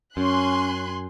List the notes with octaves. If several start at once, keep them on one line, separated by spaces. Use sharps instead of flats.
F#2 C#4 G#5 C6 F#6